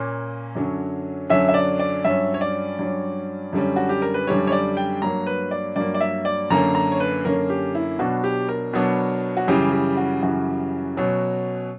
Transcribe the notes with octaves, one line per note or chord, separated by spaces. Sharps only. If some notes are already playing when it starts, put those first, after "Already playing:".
Already playing: A#2 A#3 C#4
F#2 D3 F#3 C#4
F#2 D3 F#3 C#4 E5
E5
D5
D5
G2 F#3 C#4 E5
C#5
D5
G2 F#3 C#4
F#2 D3 G3 C#4
F#4
G4
A#4
B4
F#2 D3 G3 C#4 C#5
C#5
D5
G5
G2 F#3 A#3 A#5
B4
D5
G2 F#3 A#3 D5
D5
E5
D5
F#2 D3 A#3 C#4 A#5
A#5
C#5
B4
F#2 D3 A#3 C#4 A#4
G4
E4
B2 F#3 B3 D4 F#4
G4
A#4
B2 F#3 B3 D4
F#4
F#2 C#3 E3 G3 G4
G4
F#4
F#2 C#3 E3 G3 F#4
B2 F#3 C#4